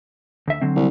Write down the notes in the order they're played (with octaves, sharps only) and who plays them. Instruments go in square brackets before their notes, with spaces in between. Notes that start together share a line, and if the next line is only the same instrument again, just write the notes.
[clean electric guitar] D2 E5
D3 F#3 C4
[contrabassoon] C2